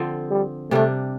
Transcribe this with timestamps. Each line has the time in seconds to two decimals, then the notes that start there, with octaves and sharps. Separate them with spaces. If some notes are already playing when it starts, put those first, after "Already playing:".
Already playing: D3 F3 C4
0.30 G3
0.71 C3 G3 A3 D4